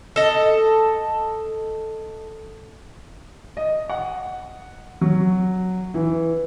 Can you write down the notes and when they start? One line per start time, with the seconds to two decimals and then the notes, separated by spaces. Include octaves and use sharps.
0.16 A4 D#5
3.57 D#5
3.89 F#5
5.01 F#3
5.94 E3